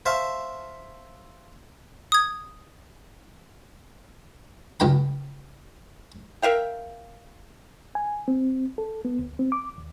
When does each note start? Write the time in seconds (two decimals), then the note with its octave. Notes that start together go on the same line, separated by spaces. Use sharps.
0.06 C5 E5 F5 A5 C#6
2.12 D#6 G#6
4.80 C#2 G2 G5 B5
6.42 A#4 E5 F5 G5
7.95 G#5
8.28 C4
8.78 A4
9.05 B3
9.19 D2
9.39 C4
9.52 D6
9.78 D#2